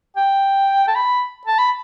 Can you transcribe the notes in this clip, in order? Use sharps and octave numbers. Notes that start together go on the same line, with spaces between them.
G5
A5
B5
A5
B5